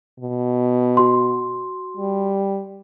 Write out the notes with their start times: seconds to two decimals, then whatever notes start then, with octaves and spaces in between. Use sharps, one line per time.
0.20 B2
0.97 F#4 C6
1.97 G3